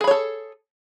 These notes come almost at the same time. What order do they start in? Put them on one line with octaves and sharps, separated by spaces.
G#4 B5 C#5 A4